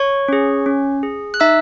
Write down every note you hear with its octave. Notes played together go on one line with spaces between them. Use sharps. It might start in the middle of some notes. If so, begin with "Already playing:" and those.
Already playing: C#5 C#6
C#4 G#4
C#4
G#4
F#6
D#4 E5 E6